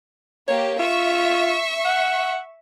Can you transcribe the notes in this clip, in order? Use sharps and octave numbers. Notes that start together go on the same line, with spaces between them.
A#3 G4 C#5
F4 E5 C#6
F#5